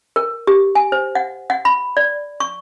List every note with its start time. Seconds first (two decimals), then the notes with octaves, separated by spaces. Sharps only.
0.16 A#4
0.47 G4
0.75 G#5
0.92 C5
1.15 F#5
1.50 F#5
1.65 B5
1.97 D5
2.40 C#6